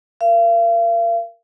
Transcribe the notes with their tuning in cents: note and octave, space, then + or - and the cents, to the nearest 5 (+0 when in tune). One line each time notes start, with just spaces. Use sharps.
A#4 +0 F5 -40